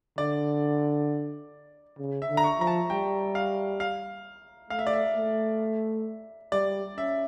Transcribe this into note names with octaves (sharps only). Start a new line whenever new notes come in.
D3 D5
C#3
E5
D3
A#5
C#6
F3 A#5
A5
G3 G5
F5
F5
A3 F5
E5
D5
E5
A3
G3 D5
C#4 E5